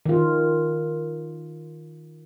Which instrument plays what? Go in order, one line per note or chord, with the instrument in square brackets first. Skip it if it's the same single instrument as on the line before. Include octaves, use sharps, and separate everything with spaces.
[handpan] D#3 F4